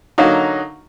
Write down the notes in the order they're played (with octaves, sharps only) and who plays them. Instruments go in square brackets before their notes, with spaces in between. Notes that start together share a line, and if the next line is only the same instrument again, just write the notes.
[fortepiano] D3 F#3 A#3 D#4